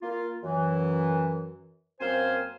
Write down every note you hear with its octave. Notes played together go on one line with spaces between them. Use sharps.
A#3 F4
F#2 E3
F#2 A#3 C4 C5 F5 G#5